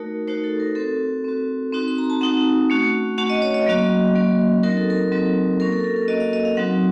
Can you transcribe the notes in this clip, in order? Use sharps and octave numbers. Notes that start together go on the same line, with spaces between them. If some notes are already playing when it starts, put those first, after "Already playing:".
Already playing: A3 D#4 F#4 A#4
A3 D#4 F#4 C5
A4
A#4
C4 F#4 A4
C4 F#4
C4 D#4 F#4
C6
A#5
A5
C4 D#4 F#4 F#5
A3 C#4 F#4
A3 C#4 F#4 F#5
D#5
C#5
D#5
F#3 A#3 C#4 F#4
F#3 A#3 C#4 F#4
F#3 C4 D#4 F#4 A#4
A4
A#4
F#3 C4 D#4 F#4
A#3 C#4 F#4 A#4
A4
A#4
A4
A#4
A#3 C#4 F#4 D#5
F5
D#5
F5
F#3 C4 D#4 F#4 F#5